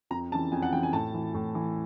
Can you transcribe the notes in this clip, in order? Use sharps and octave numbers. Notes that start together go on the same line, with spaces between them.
F2 A#5
C#3 E3 A5
F2 G#5
F#5
C#3 E3 G5
G#5
A2 A5
E3
A2
E3